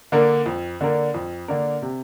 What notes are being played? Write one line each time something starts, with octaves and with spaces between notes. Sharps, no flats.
D3 A#3 D4 A#4
F2
D3 A#3 D4 A#4
F2
D3 A#3 D4 A#4
C3